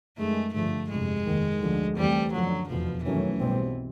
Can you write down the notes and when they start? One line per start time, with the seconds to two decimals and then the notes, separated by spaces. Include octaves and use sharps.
0.17 F#2 D#3 G#3 A3
0.54 G2 D3 F3 A3
0.90 G1 F2 C3 G#3
1.25 F1 D#2 D#3
1.61 D2 D3 F3
1.97 E2 C3 E3 G3 A3 C4
2.33 F#2 D3 F3 F#3
2.69 F1 E2 B2 F3
3.05 G2 D#3 E3 F#3 A3 C#4
3.40 B1 B2 G3 C4